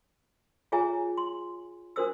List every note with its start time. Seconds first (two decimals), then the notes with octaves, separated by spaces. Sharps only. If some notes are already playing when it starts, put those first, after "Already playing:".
0.72 F4 G#4 C#5 E5 G#5 A#5
1.17 C6
1.96 D4 F#4 A#4 C5 D#6 E6